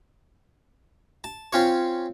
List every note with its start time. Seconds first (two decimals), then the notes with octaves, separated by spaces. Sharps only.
1.24 A5
1.53 C4 C#4 F4 C#5